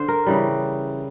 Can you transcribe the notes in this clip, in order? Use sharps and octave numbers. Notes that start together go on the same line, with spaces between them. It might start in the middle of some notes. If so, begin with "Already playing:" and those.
Already playing: D3 C5
A#4
C#3 E3 G3